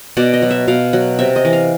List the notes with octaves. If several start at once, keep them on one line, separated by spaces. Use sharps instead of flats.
B2 D5
D#5
F#3
E5
B2 F5
F#3
C3 E5
D#5
E3
F5